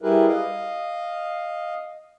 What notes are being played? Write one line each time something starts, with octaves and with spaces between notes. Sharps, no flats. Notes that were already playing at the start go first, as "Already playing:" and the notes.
G3 E4 G4 G#4 A#4 B4
D#5 F5